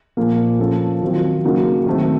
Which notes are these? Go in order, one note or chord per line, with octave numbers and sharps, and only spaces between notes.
A#2 F3 A#3
F3 A#3 C#4 A4
D#3 F#3 C4 F4
C#3 F#3 A#3 D#4 F#4
D#3 F#3 A3 C4